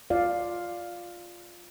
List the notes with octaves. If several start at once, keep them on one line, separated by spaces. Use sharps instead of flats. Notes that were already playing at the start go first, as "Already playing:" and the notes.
F4 D5 F5